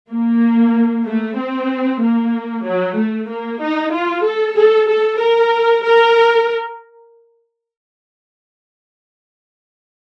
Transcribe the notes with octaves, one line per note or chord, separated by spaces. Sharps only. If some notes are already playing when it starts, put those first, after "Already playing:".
A#3
A3
C4
A#3
F#3
A3
A#3
D#4
F4
A4
A4
A4
A#4
A#4